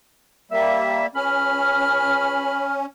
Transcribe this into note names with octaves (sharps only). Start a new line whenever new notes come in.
G3 A#3 E5
C#2 C#4 B5 F6